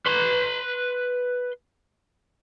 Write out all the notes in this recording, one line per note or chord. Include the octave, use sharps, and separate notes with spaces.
B4 C6